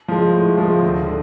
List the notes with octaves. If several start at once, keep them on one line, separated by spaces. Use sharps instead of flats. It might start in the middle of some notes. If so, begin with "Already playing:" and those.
F3 G#3
A2
F3 G#3
D2
D3